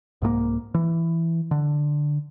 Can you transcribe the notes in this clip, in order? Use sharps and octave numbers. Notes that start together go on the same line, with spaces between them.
C2 G#2 G3 A#3
E3
D3